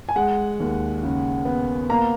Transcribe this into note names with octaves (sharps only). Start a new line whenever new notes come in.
G#5
G#3 F#5
D#2
C#3
B3
A#3 A#5